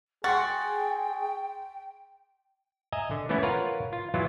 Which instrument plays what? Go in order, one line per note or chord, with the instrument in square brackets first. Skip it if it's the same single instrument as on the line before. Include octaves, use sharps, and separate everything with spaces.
[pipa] F#4 [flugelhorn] G#4 [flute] G5 [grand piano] C6 C#6 A6
[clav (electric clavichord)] D#5 E5 G#5 A#5
D3
E3 A3 B3 C#4 E4
F4 A#4 B4 C#5 F#5
F4
E3 F#3 G#3 B3 E4 F4